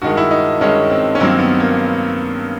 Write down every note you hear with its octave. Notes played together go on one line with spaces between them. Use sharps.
G2 D#3 G#3 F#4
E4
D#4
G2 D#3 G#3 C#4
C4
C#4
G2 D#3 F#3 A#3 C4
B3
A#3